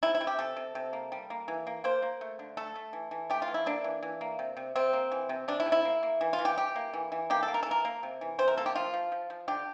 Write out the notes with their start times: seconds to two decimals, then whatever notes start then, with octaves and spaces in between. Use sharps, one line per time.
0.03 C3 E4
0.15 E4
0.21 C3
0.27 G4
0.39 C3 A4
0.57 C3
0.75 C3
0.93 A#3
1.12 G3
1.30 A#3
1.48 E3
1.67 A#3
1.84 A#3 C5
2.02 A#3
2.21 A3
2.39 D3
2.57 A3 A4
2.76 A3
2.93 E3
3.11 E3
3.30 A3 G4
3.42 F4
3.48 E3
3.54 E4
3.66 A#3 D4
3.84 E3
4.03 E3
4.21 A#3
4.39 C3
4.57 C3
4.75 C3 C4
4.93 A#3
5.12 E3
5.29 C3
5.48 C3 D4
5.60 E4
5.66 C3
5.72 E4
5.85 A#3
6.03 A#3
6.21 E3
6.33 F4
6.39 E3
6.45 G4
6.58 E3 G4
6.76 A#3
6.94 E3
7.12 E3
7.30 A#3 G4
7.43 A4
7.48 A#3
7.54 A#4
7.63 A4
7.67 E3 A#4
7.85 A#3
8.03 C3
8.21 E3
8.39 C3 C5
8.48 A#4
8.57 A#3 A4
8.66 G4
8.75 F3 F4
8.94 F3
9.12 F3
9.30 F3
9.48 D3 G4